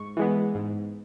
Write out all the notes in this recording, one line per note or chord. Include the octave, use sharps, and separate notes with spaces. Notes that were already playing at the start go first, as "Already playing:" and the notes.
Already playing: G#2 C#6
E3 G#3 B3
G#2